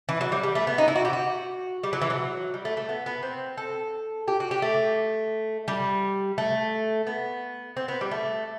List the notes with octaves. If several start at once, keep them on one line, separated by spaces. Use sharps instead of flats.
E3
F#3
G3
G3
A3
B3
D#4
E4
F#4
G4
F#4
G3
F#3
E3
F#3
G3
A3
A3
B3
B3
C4
A4
G4
F#4
G4
A3
G3
A3
B3
C4
B3
G3
A3